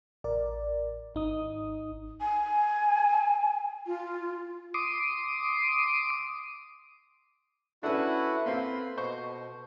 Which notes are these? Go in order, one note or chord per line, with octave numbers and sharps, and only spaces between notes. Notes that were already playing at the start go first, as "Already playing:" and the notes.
A1 A#4 D5
G#1 D#4 D#6
G#5
F4
C6 D6 D#6
C#4 D4 E4 F#4 A4 B4 F#5
A#3 C4 F4 B5 C6
B2 C5 D#5 C#6